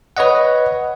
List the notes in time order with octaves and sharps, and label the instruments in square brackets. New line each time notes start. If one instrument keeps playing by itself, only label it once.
[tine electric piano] B4 C#5 D#5 F#5